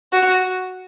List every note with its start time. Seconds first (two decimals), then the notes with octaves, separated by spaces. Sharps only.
0.12 F#4